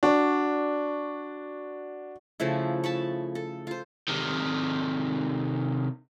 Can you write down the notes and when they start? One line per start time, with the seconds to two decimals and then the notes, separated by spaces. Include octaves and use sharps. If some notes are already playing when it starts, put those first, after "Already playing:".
0.03 D4 F#4 D5
2.40 C#3 F3 A3 E4
2.84 A5 B5 C#6
3.35 A4
3.67 F4 C5
4.08 C3 D#3